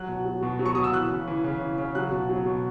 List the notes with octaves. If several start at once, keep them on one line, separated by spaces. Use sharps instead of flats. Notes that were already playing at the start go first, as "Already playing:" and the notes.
Already playing: F#3 F#6
B2
F#3
B2
F#3
C#6
B2 D#6
E6
E3 F#6
C#3
E3
C#3
E3
C#3
F#3 F#6
B2
F#3
B2